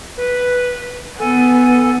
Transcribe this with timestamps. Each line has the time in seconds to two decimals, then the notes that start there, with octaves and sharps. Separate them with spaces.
0.17 B4
1.19 B3 A4 G#5